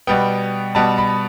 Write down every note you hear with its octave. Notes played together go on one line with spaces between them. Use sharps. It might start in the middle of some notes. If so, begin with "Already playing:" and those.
B2 G3 B3 G5
B2 G3 B3 A5
B5